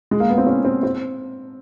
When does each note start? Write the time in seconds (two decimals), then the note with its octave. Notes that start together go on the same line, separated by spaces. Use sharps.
0.11 G#3
0.20 A#3
0.29 B3
0.38 C4
0.47 C#4
0.65 C4
0.83 C4